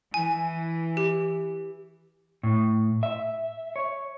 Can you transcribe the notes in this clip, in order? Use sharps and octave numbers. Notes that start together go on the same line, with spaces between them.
E3 G#5
G4
A2
E5
C#5